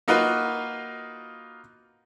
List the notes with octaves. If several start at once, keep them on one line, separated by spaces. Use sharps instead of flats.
A#3 D#4 F4 F#4 B4